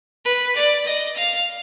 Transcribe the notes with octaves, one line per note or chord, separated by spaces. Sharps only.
B4
D5
D#5
F5